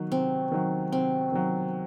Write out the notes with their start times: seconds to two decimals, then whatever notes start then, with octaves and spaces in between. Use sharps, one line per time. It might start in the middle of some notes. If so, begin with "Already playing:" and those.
Already playing: D#3 F#3
0.11 C3 C4
0.52 D#3 F#3
0.92 C3 C4
1.32 D#3 F#3